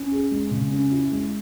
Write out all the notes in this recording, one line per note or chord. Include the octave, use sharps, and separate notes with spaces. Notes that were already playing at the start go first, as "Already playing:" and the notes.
Already playing: C#4
G#4
G#3
C#3
C#4
E4
G#3